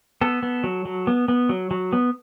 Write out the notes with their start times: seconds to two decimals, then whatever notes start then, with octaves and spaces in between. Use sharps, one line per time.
0.21 B3 A4
0.43 B3
0.64 F#3
0.85 F#3
1.07 B3
1.28 B3
1.49 F#3
1.71 F#3
1.93 B3